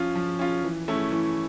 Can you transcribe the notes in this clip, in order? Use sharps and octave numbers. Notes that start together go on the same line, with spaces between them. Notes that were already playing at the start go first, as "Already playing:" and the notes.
Already playing: F3 C#4 F4
F3
C#4 F4
E3
A3 C#4 E4
E3